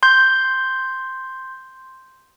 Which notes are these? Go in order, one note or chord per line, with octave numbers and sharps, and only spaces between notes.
C6 G6